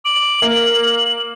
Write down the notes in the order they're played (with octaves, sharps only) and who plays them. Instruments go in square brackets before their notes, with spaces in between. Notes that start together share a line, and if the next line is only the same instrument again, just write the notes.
[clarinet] D6 [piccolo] F#7
[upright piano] A#3 [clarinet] A#4